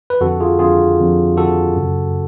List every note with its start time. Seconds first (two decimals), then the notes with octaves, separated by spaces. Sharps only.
0.10 B4
0.21 F2 D3 F#4 A4
0.40 F4 G#4
0.59 F2 D3 F4 G#4
0.99 F2 D3
1.37 F2 D3 F#4 A4
1.76 F#2 C#3